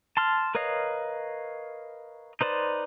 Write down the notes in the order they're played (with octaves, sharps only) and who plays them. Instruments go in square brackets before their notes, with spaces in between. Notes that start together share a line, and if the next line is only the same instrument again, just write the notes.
[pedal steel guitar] A5 C6 F6
A#4 B4 C#5 D#5 F5
D#4 B4 C5 D5